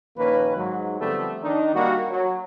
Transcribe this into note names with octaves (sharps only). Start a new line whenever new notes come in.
A#1 D#3 A#3 C#4 B4
G#2 F#3
D3 F3 G3 A3 B3 C4
D#3 D4 D#4
G3 A#3 F#4
F#3